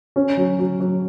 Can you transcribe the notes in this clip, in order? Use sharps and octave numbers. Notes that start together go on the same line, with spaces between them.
C#4
F#3
F#3
F#3